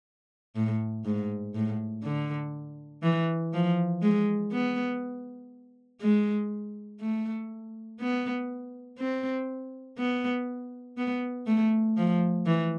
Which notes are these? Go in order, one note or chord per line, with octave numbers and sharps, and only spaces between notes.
A2
G#2
A2
D3
E3
F3
G#3
B3
G#3
A3
B3
C4
B3
B3
A3
F3
E3